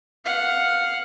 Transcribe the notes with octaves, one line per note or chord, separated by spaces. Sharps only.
F5 F#5